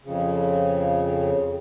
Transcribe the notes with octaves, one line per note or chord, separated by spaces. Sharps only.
F2 C#3